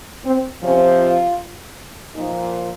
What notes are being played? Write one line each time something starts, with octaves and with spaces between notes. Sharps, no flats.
C4
C3 F3 C#4
F4
A#2 F3 D#4